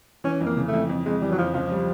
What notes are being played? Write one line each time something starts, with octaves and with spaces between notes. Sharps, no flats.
E3 C#4
F2
A#3
C#3
A3
F2
F2
F2 G#3
E3 G3
F#3
F2 F3
C#2 F3
G3